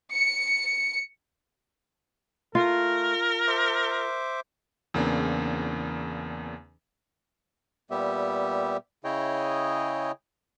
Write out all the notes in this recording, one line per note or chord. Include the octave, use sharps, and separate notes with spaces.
C#7
A3 F4 A#4
C5 E5 D6
E2 C#3 A#3 C4 D4
A#2 G3 B3 G4 E5
C#3 E4 G#4 C#5 D#5 G5